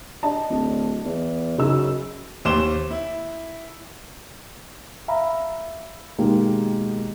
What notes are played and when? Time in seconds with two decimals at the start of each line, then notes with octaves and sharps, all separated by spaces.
0.23 D4 D#5 A5
0.50 D1
1.05 E2
1.58 F#2 C#3 D#4 E6
2.45 D#2 C5 D6 E7 G7
2.91 E4
5.08 E5 F5 A#5 B5
6.18 B2 D#3 G#3 A#3 G4